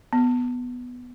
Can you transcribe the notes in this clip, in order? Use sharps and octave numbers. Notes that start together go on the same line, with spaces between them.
B3